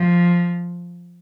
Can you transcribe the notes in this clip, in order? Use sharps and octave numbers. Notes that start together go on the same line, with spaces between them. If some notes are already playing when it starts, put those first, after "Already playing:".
Already playing: F3